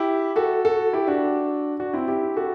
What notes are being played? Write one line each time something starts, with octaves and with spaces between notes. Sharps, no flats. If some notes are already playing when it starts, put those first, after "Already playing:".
Already playing: E4 G4
F#4 A4
F#4 A4
E4 G4
D4 F#4
D4 F#4
C4 E4
E4 G4
F#4 A4